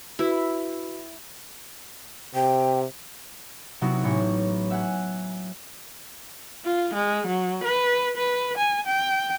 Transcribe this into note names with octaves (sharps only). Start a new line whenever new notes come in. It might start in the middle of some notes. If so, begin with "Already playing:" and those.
E4 F#4 B4
C3 G5
C3 F#3 B3 D#4 E4 F#4
A1 C#5
E5 F#5 G#5 F#6
F4
G#3
F#3
B4
B4
G#5
G5